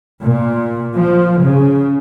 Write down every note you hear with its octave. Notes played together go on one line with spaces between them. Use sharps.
A#2
F3
C#3